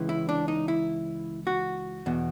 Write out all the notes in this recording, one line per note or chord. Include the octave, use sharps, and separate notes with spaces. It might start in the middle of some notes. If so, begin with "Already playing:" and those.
Already playing: C#2 C#3 E3
E4
D4
D#4
E4
F#4
E2 B2